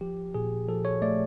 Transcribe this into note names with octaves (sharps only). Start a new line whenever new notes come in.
F3 G4
A#2 G#4
F3 A4
C#5
A3 D5